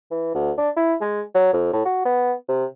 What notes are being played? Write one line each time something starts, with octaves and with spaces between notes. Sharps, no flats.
E3
D2
D4
E4
G#3
F#3
F2
A2
F#4
B3
C3